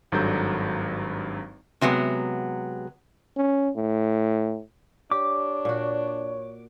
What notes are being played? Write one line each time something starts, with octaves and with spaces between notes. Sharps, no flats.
G#1 G2 F#3 A4 A#5 G6
C3 F#3 G#3 B3
C#4
A2
D4 G4 C#5 D6
A#2 F#4